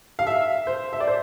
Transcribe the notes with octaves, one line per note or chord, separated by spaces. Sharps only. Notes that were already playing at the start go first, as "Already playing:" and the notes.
F5
E5
C5
E5
D5
C5